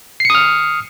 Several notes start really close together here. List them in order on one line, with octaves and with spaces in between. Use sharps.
C7 C#7 D#6 F6